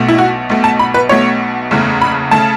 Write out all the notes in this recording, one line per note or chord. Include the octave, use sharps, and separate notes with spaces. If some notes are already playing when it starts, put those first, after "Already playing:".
Already playing: B1 B2 A3
E4
F#4
B1 B2 A3
A5
B5
B4
B1 B2 A3 C#5
F#1 E2 C#3 A3
B5
C#3 A3 A5